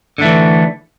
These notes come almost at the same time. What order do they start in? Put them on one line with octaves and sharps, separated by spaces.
D3 A3 E3